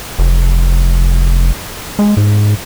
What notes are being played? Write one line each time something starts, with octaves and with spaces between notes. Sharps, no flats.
F1
G#3
G#2